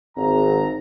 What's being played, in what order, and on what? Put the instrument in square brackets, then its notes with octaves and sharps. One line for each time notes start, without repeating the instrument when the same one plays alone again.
[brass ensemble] G#1 A#5